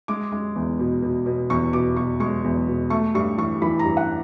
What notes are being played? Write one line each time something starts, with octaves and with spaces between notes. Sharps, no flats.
G#3 D6
G#3
E2
B2
B2
B2
E2 C#6
B2 D6
B2 C#6
G#3 C#6
E2
B2
A3 C#6
G2 C#6
E3 C#6
E3 B5
A#5
G2
F#5